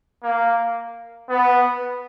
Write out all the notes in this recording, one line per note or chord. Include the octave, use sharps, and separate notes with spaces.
A#3
B3